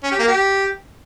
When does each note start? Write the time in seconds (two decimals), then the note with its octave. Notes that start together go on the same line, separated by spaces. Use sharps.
0.04 C#4
0.12 G4
0.20 A#3
0.28 G4